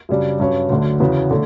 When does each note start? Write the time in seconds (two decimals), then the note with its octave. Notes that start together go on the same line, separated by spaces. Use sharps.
0.09 F#2 C#3 G3 D4
0.40 G2 F#3 C#4
0.70 D2 D3 F#3
1.00 E2 C#3 F#3 B3 F#4
1.31 D3 A3